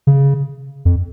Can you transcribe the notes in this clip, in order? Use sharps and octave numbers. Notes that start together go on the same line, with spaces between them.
C#3
F2